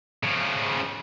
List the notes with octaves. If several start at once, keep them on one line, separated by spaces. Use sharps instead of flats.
C#3 F3